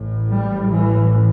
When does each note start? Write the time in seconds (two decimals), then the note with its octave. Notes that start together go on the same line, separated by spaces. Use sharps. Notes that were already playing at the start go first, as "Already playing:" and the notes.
Already playing: A1 A2
0.31 G3
0.72 E3